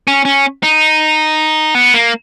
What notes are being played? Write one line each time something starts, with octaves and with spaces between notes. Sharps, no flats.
C#4
C#4
D#4
B3
A#3